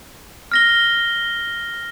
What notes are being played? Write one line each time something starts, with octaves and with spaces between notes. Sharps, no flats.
F6 A#6 G7